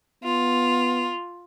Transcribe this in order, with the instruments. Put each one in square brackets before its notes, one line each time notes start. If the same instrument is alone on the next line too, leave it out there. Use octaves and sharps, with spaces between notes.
[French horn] B3 [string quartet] F4